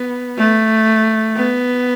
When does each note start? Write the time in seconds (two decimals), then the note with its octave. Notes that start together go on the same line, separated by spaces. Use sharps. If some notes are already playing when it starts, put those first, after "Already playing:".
Already playing: B3
0.38 A3
1.36 B3